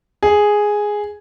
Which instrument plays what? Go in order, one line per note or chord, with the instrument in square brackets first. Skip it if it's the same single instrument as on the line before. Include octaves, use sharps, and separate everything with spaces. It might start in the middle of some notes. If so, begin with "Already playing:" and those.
[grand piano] G#4